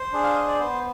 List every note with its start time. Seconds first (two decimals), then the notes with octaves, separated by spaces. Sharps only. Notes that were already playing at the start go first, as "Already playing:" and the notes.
Already playing: C5
0.13 D4 G#4
0.23 F5
0.35 D#5
0.48 D5
0.59 B3 C5